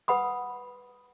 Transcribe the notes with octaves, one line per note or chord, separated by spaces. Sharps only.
B4 F#5 B5 D#6